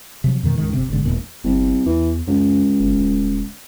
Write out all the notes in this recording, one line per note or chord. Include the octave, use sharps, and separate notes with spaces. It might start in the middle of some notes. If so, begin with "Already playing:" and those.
C3 F3 F#3
F2 B2 D#3 A3
C#2 G#2 D#3
F#1 C3
F#1 B1 G#2 D3
E1 A#2
G1 C2
E2 E3
C#2 F#2
G1
D#1